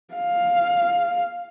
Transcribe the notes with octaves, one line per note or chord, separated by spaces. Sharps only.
F5